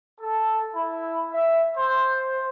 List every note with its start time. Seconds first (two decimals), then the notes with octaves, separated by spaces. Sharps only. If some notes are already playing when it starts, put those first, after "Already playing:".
0.20 A4
0.74 E4
1.31 E5
1.77 C5